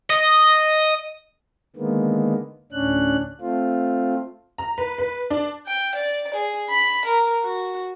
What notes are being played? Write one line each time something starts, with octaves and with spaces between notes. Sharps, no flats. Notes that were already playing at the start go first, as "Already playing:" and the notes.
D#5
D3 D#3 G#3 A#3 B3
D2 A2 C#4 D4 F#6
A3 C4 F4
A#5
B4
B4
D4
G5
D5
G#4
B5
A#4
F#4